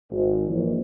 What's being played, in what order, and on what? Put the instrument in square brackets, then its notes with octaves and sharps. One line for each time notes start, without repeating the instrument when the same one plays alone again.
[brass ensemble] G#1
A#1 E3